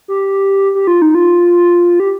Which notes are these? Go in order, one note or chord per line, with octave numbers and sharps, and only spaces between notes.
G4
G4
F4
D#4
F4
G4